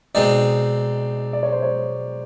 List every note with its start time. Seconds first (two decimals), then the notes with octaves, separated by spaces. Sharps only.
0.15 B2 G#3 C4 D#4 D5
1.33 D5
1.43 C#5
1.52 C5
1.62 C#5